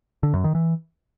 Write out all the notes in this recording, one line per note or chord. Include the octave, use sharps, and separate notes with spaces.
D3
F#2
D#3
E3